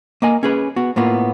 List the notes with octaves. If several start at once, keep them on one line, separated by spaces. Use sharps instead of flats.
A#3 D#5 G#5
C#4 G#4 B4
B3 F#4
A2 A#3 B3 F4